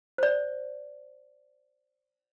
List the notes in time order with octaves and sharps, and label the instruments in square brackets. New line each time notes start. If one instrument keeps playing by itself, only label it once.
[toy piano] C5 D5